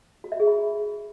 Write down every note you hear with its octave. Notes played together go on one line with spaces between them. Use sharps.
F#4
E5
G#4
B5